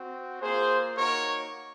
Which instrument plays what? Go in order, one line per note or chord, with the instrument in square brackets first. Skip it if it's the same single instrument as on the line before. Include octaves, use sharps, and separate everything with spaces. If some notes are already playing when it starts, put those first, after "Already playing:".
Already playing: [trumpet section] C4 F#4
A#3 F4 G#4 C5
A#3 D#4 F#4 A#4 C#5